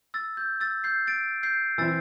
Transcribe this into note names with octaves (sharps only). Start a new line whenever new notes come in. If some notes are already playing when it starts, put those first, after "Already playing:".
E6 A6
G6
E6 A6
G6 C7
A6 D7
G6 C7
E3 C4 E4 E6 A6